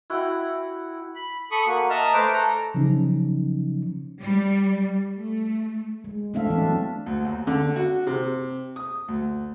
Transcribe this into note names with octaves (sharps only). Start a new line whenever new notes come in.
E4 F#4 F#5 G5
B5
A4 B5 C#6 D#6
A#3 F#4
D#5 E5 A5 A#5 F6
A3 B4 C5 D6
A4 A#5
C#3 F3 F#3 C#4 D#4
G3
A3
G#3
A3 C4 D4 E5 F5
E3 B3 C4 D4
F#3
D2
D#2
D3
F#4
C3
D#6
D2